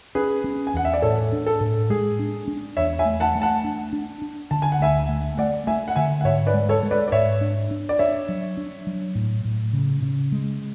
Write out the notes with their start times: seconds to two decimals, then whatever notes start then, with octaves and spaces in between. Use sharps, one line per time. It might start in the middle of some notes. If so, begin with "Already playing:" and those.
0.15 C#4 G#4 B4
0.44 C#4
0.67 G#5
0.74 E2 F#5
0.85 E5
0.94 D5
1.02 A2 A4 C#5
1.32 D4
1.46 A4
1.61 A2
1.90 G#3 G#4
2.19 D4
2.48 D4
2.77 E2 C#5 E5
2.99 E5 G#5
3.05 A3
3.20 F#5 A5
3.35 A3
3.42 F#5 A5
3.64 D4
3.93 D4
4.22 D4
4.51 D3 A5
4.62 G#5
4.72 F#5
4.80 D2 E5 G#5
5.09 A3
5.38 A3 D5 F#5
5.67 A3 E5 G#5
5.88 F#5
5.96 D3 E5 G#5
6.21 F#5
6.25 G#2 C#5 E5
6.47 B4 D5
6.54 G#3
6.69 A4 C#5
6.83 G#3
6.91 B4 D5
7.08 D5
7.12 G#2 C#5 E5
7.41 D4
7.71 D4
7.89 D5
7.99 D4 C#5 E5
8.29 F#3
8.57 D4
8.87 F#3
9.15 A2
9.45 A2
9.73 C#3
10.02 C#3
10.32 G#3